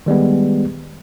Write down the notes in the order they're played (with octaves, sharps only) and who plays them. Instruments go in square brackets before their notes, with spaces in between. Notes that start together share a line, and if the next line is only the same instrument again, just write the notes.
[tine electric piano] D#3 G3 G#3 B3